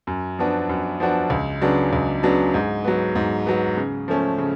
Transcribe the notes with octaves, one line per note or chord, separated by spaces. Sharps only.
F#2
F3 B3 D4 F#4
F#2
F3 B3 D4 F#4
C#2
C#3 F#3 B3 D4
C#2
C#3 F#3 B3 D4
G#2
F#3 B3
G#2
F#3 B3
C#3
F3 A3 C#4
C#3